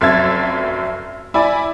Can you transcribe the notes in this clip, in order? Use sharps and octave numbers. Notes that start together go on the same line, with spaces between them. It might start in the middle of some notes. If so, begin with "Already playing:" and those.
F1 F#2 E5 A5 G#6 A6
E4 D5 G#5 B5